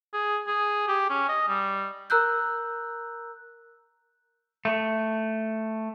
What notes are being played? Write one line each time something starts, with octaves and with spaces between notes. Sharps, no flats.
G#4
G#4
G4
C#4
D#5
G3
A#4 A#5 E6 F#6 G6
A3